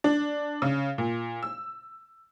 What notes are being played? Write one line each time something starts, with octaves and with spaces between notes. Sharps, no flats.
D4
C#3
A#2
E6